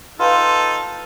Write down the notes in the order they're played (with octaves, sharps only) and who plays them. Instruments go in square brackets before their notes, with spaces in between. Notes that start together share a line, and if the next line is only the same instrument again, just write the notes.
[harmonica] D#4 A4 [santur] F4 B4 G5